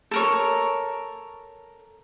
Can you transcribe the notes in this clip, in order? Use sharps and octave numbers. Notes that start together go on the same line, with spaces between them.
A4 A#4 C#5